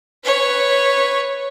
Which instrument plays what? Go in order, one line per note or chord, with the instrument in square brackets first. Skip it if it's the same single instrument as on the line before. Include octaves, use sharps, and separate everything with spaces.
[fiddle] B4 C#5